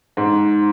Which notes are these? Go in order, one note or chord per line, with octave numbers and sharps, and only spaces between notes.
G#2